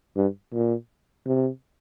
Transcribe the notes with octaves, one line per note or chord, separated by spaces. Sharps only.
G2
A#2
C3